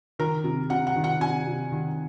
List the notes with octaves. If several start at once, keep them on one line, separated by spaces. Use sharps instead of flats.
D#3 A#4
C3
C3 F#5
F#5
D#3
F#5
C3 G#5
C3
D#3